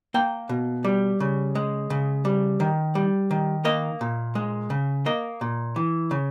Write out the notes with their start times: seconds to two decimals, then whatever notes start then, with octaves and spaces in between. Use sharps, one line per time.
0.14 A#3 G5
0.49 B2
0.84 G3
1.20 C#3
1.55 G#3
1.90 C#3
2.25 G3
2.60 D#3
2.95 G3
3.31 D#3
3.65 A#3 D#5
4.01 A#2
4.35 G#3
4.70 C#3
5.06 A#3 D#5
5.41 A#2
5.76 E3
6.11 C#3